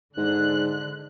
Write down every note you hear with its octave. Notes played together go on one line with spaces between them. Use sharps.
G#2 D3 F#6